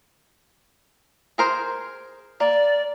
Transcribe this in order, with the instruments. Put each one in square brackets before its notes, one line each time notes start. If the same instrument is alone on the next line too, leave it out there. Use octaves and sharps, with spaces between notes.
[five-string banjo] G#4 A#4 C5
[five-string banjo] A#3 [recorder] D5